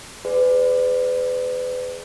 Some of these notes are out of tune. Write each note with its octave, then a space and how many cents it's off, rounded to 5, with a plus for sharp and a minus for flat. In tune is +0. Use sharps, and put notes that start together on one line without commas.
G#4 +0 B4 +35 D5 +0